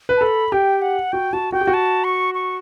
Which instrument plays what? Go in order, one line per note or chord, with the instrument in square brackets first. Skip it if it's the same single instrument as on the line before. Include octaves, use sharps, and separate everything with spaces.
[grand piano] B4
[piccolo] A5
[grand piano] A4 [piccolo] B5
[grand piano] G4 [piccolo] G5
[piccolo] F#5
[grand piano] F#4 [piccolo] G5
[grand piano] F#4 [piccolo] A5
[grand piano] F#4 [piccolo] G5
[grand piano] G4
F#4
[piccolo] A5
C#6
C#6